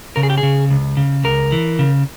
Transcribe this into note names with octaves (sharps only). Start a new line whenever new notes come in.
C#3 A#4
G#4
G4
G#4
C#3
C#2
C#3
C#2 A#4
E3
C#3